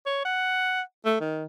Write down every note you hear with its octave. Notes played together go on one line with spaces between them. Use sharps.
C#5
F#5
A3
D#3